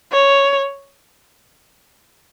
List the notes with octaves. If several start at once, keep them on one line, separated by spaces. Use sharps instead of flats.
C#5